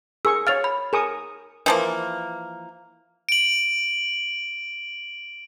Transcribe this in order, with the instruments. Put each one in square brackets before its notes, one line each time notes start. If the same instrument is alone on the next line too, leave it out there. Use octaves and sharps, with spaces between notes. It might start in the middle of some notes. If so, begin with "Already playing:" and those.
[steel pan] G#4 A#4 C#6 [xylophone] E6
[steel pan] C#5 F5 [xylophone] F6 A6 F7
[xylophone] B5
[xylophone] G#4 G#5 [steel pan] A#4 C#6 D#6
[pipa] E3 F3 A#3
[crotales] D7 F#7